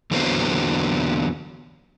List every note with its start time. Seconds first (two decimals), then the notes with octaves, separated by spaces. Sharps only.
0.11 E2 D3 F#3 A#3 B3 C5